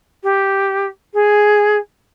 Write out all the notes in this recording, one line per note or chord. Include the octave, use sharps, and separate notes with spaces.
G4
G#4